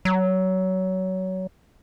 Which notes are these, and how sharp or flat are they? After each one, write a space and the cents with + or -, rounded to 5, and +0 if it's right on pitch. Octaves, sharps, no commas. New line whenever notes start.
F#3 +20